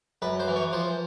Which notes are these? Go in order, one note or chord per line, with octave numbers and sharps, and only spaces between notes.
F#2 B4
C5
E3
C#5
F3 C5